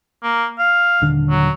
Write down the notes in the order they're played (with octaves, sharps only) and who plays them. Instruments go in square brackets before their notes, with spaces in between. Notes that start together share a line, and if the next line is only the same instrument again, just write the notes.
[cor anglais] A#3
F5
[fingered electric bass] D#1 D3 D4
[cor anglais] F#3